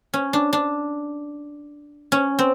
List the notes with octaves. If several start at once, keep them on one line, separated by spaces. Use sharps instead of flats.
C#4
D4
D4
C#4
C4